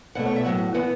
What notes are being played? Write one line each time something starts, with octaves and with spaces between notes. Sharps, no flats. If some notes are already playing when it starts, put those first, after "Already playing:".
B2 A3 F#5
C#5
E5
A2 F#3 A3 F#5
E3 B3 F#5